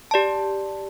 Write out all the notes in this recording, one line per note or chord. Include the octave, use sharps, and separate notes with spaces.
G4 D5 A5